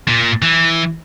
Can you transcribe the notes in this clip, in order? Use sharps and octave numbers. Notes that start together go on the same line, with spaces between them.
A#2
E3